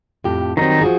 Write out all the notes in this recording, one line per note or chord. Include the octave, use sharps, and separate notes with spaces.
F2 A2 G4
D#3 F#3 G3 C4 D#4
F3 F#4 G#4